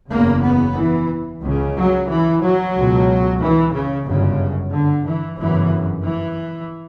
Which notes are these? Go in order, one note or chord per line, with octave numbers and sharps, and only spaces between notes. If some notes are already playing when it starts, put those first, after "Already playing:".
F#1 E2 C#3 A#3
B3
E3
C#2 C#3
F#3
E3
F#3
C#2 B2
E3
C#3
G1 F#2 C#3
D3
E3
G1 F#2 C#3 E3
E3